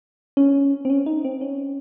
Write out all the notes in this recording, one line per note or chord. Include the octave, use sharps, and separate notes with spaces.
C#4
C4
C#4
D#4
C4
C#4